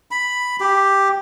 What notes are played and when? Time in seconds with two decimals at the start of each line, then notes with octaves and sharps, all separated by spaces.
0.11 B5
0.60 G4